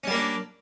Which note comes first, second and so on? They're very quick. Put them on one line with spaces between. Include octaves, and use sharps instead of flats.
C#4 G3 A#3 D4